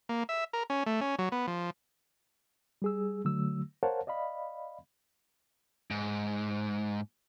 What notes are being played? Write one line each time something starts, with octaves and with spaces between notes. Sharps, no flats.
A#3
E5
A#4
C#4
A3
C#4
F#3
B3
F3
G3 G#4 E6
D3 F#3 A3 E6
A#4 C5 C#5 F5 F#5 A5
D5 D#5 F5 B5
G#2